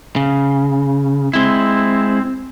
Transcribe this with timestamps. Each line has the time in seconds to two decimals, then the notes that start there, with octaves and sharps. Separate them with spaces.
0.16 C#3
1.33 G#3 C4 E4